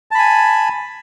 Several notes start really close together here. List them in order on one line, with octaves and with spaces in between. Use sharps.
A5 B5 G#5